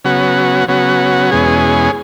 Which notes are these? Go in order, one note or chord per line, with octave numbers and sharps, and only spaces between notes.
C#3 F#3 B3 F#4
C#3 F#3 B3 F#4
E2 B2 G#3 C#4 G#4